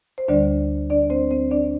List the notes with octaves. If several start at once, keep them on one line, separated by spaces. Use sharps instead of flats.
C5
D2 D3 G3 D4 D5
D4 D5
C4 C5
C4 C5
D4 D5